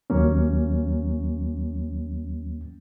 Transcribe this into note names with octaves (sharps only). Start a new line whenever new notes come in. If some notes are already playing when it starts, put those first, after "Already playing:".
D#2 F#3 A#3 C#4